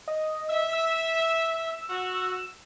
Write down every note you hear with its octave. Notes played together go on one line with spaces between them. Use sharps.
D#5
E5
E6
F#4